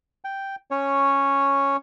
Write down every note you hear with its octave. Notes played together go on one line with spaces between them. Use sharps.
G5
C#4 C#5